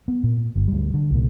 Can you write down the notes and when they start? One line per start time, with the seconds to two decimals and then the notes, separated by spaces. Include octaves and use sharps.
0.08 B3
0.23 A#2
0.56 G1 G2
0.68 D2 G3
0.94 D3
1.11 C2 A#2